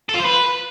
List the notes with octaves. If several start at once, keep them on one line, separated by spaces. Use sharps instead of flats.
A4
F4
C5
B4